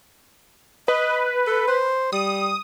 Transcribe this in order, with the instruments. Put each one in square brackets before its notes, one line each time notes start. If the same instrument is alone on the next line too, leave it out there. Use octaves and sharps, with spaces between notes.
[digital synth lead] B4 [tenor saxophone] D#5
[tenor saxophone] A4
C5
[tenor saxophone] G3 [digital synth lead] D#6